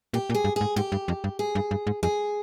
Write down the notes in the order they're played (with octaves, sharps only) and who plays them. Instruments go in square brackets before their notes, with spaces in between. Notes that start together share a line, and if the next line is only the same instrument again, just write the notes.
[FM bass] A#2 [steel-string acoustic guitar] G4
[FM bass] A#2
[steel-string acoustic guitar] G#4
[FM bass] G2
[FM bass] G#2 [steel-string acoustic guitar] G#4
[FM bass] G#2 [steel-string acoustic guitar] G4
[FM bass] G2
F2
G2
[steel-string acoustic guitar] G#4
[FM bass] G2
G2
G#2
[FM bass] F2 [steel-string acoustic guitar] G#4